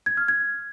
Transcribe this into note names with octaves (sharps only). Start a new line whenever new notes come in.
G#6
F6
G#6